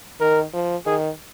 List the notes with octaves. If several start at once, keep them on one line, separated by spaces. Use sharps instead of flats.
D#3 A#4
F3
D#3 G#4